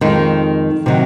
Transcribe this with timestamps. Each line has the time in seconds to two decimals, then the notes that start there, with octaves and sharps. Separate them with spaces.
0.01 F2 D#3 G#3 D#4
0.86 C3 D#3 F#3